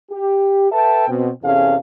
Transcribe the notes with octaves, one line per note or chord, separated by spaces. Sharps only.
G4
A4 B4 E5 G5 A5
B2 C4
E2 C3 C#4 G#4 A4 F5